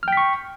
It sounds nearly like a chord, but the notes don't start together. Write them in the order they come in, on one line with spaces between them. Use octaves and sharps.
F6 G5 B6 C#6